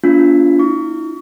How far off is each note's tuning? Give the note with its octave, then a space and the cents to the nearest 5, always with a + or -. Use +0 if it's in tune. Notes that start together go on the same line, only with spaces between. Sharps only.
B3 -45 D4 -25 F4 +0
E4 -40 C#6 +35